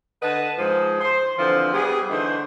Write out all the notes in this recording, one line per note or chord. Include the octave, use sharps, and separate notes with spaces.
D3 B4 D#5 F#5 A5
G#2 F3 G#4 C5
C5
D3 E3 F3 C4
G3 B3 G#4
D3 E3 A3 D#4 C5